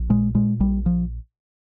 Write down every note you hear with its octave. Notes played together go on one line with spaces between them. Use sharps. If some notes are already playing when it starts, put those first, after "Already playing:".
Already playing: A#1
A#2 G#3
A#2 G#3
A#1 G3
F3